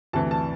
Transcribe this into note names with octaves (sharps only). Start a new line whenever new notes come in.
D2 C3 E3 A5
A5